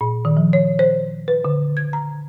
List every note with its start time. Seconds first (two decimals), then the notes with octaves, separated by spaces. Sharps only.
0.01 A#2
0.25 D#3
0.37 F3
0.53 C#5
0.79 C5
1.28 B4
1.45 D3
1.77 G#6
1.93 A#5